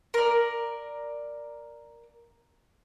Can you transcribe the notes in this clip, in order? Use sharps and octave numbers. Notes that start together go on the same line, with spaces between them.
A#4 D5